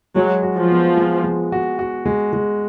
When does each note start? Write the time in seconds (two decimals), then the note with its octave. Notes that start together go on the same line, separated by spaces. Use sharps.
0.16 F#3 G#3
0.43 F#4
0.57 F3
0.70 B3
0.97 G#3
1.24 G#3
1.52 F#4
1.79 F#4
2.06 G#3
2.33 G#3